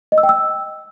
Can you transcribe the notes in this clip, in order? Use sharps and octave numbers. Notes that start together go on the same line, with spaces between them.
D#5
E6
G5
E6